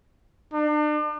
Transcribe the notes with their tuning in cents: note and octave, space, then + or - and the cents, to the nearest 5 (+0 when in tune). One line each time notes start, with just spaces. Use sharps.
D4 +40